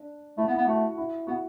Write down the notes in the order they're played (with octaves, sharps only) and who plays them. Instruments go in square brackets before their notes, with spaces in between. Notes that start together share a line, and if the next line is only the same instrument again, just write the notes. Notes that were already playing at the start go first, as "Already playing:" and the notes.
Already playing: [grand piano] D4
[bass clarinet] A3 [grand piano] E4
[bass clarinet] B3
[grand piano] E4
[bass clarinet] B3
[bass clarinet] A3 [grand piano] F#4
[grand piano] E4
[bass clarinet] B3 [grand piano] F#4